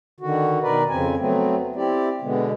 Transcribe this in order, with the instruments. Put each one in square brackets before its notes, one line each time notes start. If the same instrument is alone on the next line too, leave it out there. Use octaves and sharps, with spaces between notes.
[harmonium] D3 D#3 F#4
B2 D#3 A#4 B4 D5
F2 C#3 C4 G#5
F#3 A3 B3 C4
C4 E4 G4 D5
B2 D3 G#3 B3